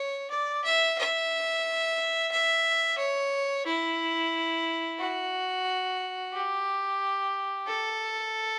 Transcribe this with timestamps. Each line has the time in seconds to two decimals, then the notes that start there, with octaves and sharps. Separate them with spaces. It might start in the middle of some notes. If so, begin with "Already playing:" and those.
Already playing: C#5
0.30 D5
0.64 E5
0.98 E5
2.31 E5
2.98 C#5
3.66 E4
4.98 F#4
6.33 G4
7.67 A4